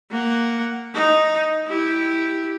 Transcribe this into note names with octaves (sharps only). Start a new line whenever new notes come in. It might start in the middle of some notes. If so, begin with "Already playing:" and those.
A#3 F#5
D#4
E4 G4